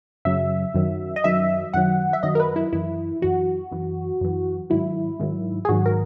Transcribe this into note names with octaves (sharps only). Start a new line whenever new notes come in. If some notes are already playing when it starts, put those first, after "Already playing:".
F#2 C#3 F#3 E5
F#2 D#3 F#3
D#5
F#2 D#3 F#3 E5
F#2 D#3 F#3 F#5
E5
F#2 D#3 F#3 D#5
A#4
B4
E4
F#2 E3 E4
F#2 E3 F#4
F#2 E3
F#2 E3
G#2 D#3 F#3 E4
G#2 D#3 F#3
G#4
G#2 D#3 F#3 F#4
A#4